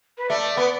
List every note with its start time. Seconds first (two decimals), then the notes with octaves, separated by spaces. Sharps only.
0.18 B4
0.29 A3 D5
0.57 B3